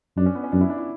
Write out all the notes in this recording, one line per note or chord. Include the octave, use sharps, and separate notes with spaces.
F#2 D4
C#4
B3
C#4
F#2 D4
E4
D4
E4